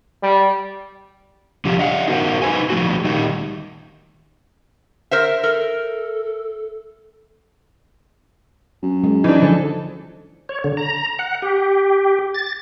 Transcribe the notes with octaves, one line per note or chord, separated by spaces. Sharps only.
G3
D3 F3 F4 G4
D#5 F5 F#5
D#4 F#4 A#4 C5 F#5
D#4 B4 C5 G#5
F3 A3 F#4
D#3 G3 D#4
A#4 C5 E5
A4 A#4
F#2
G#3
E3 D4 D#4
D3 F3 A4
C#5
D3
A#5
F#5
G4
A6